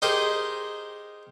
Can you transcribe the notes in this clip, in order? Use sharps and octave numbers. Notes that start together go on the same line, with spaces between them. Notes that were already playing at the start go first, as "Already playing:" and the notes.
D#4 G4 G#4 A#4 C5 D#5